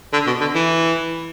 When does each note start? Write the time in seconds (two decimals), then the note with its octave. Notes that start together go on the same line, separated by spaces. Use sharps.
0.13 D3
0.27 B2
0.41 D3
0.55 E3